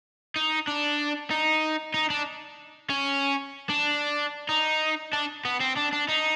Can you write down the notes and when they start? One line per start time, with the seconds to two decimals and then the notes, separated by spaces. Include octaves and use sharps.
0.36 D#4
0.67 D4
1.30 D#4
1.94 D#4
2.10 D4
2.90 C#4
3.69 D4
4.49 D#4
5.13 D4
5.45 B3
5.61 C4
5.77 D4
5.93 D4
6.08 D#4